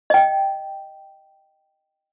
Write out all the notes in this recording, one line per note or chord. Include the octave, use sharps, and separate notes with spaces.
D#5 G5